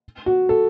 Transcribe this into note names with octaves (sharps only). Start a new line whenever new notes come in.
F#4
A4